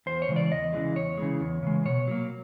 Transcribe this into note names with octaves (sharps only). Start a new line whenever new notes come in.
E2 C5
C#5
C#3 E3 G#3
D5
E2 D#5
C#3 E3 G#3
E2 C#5
C#3 E3 G#3
E2
C#3 E3 G#3
B2 C#5
F#3 A#3